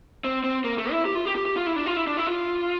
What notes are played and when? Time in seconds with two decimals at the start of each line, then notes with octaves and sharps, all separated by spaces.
0.24 C4
0.44 C4
0.64 A#3
0.78 A3
0.91 E4
1.05 G4
1.15 F4
1.25 G4
1.35 G4
1.46 G4
1.57 F4
1.67 E4
1.76 D4
1.86 F4
1.97 E4
2.07 D4
2.17 E4
2.27 F4